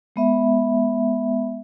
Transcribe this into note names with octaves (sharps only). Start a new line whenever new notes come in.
G#3 B3 E5